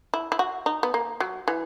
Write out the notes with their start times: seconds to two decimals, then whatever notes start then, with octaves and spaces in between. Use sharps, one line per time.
0.14 E4
0.32 E4
0.39 F#4
0.66 D#4
0.83 B3
0.94 A#3
1.20 F#3
1.48 E3